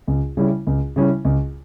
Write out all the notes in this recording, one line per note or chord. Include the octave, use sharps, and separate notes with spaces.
C#2
C#3 G3 C#4 E4
C#2
C#3 G3 C#4 E4
C#2